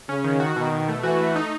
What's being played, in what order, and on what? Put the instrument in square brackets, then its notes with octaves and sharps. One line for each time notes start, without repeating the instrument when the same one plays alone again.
[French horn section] C#3 [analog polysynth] C#4
[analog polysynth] D#3
F#4
[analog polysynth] B2 [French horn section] D#3
[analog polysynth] B2
A3
[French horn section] E3 [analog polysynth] F#4
[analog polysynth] A3
D#4